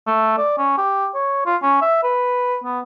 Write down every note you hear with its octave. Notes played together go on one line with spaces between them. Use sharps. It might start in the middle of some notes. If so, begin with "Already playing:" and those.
A3
D5
C#4
G4
C#5
F4
C#4
E5
B4
B3